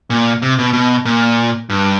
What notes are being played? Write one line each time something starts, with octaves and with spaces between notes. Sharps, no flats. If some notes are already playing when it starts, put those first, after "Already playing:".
A#2
C3
B2
B2
A#2
G2